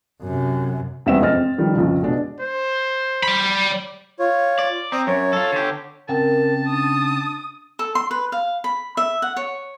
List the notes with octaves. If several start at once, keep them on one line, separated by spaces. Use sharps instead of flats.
F#2 C3
E2 G3 G#3 C4 E5 E7
F2 G#3 C4 D#5 F6 A6
C4
D#3 F3 G3
A#1 F2 C#3
B2 G#3 D4
C5
D5 B5
F4 C#5
D5
C4 A#5 D6 D#6
F#2 C#5
F4 A4
D3 G4
C#3 C4 A#4 G5 A5
D4 D#6
A4
C6
B4
F5
B5
E5
F#5
C#5